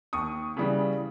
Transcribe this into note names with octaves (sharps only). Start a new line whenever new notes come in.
D#2 C#6 D#6
C#3 E3 G3